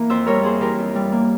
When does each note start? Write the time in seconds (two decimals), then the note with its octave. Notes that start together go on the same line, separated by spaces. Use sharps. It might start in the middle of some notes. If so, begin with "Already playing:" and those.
Already playing: E3 A#3 A#4
0.10 F2 C5 E5
0.26 G3 A#4 C#5
0.42 A#3 G#4 C5
0.61 E3 G4 A#4
0.78 F2
0.95 G3
1.12 A#3